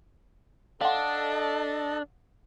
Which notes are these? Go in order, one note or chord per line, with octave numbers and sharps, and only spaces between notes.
D4 A4 D#5 F5 F#5 A5